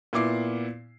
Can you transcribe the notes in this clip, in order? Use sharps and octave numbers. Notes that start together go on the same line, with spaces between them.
A#2 B3 E4 D6 C7